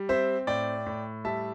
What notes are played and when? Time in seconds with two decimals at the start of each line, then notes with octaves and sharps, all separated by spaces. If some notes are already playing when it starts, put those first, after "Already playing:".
Already playing: G3
0.09 C4 C5 E5
0.47 A2 D5 G5
0.86 A2
1.25 G3 E5 A5